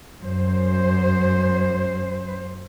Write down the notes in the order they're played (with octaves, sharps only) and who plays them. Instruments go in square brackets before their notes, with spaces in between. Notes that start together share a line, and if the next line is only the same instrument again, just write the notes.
[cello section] F#2 C5